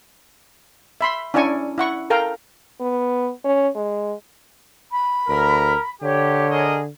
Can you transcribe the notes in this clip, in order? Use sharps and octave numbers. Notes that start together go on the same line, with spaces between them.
E5 B5 C6
C#4 D4 E4 D5 G#5 C#6
E4 F#5 C#6
A4 A#4 F5 G5 A#5
B3
C#4
G#3
B5
D2 A#4
D3 G4 C#5
G#4 A#4 D#5